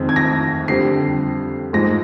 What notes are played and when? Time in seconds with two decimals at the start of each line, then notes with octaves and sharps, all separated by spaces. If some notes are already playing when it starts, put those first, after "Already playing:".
Already playing: F2 D#3 G#3 C4
0.09 G#6
0.16 A#6
0.68 F2 D3 G3 C4 C7
1.73 G#2 F3 G#3 A#6